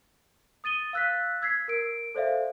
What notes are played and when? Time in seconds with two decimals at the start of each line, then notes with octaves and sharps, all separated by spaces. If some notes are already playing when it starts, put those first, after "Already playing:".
0.64 D#6 A6 D#7 G7
0.93 F5 E6 F#6 A6 B6
1.42 E6 G#6 B6 C7
1.68 A#4 D7
2.15 A4 C5 D5 E5 F5